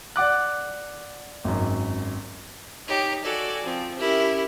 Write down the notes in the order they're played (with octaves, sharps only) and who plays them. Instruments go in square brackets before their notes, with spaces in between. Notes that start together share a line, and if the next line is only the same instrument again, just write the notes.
[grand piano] D5 F#5 D6 F#6
G#1 F#2
[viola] D#4 [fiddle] G4 C#5
[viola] F#4 G#5 [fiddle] A4 D5
[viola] F3 [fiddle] C4
[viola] C#4 G4 [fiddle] E4 A#4